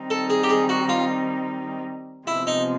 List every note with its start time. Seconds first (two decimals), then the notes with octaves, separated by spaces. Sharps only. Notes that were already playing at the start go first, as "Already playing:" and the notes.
Already playing: D#3 G3 C4 D#4
0.10 A4
0.30 G#4
0.44 G4
0.49 G#4
0.69 F#4
0.89 F4
2.27 C3 F3 G#3 B3 E4
2.47 D#4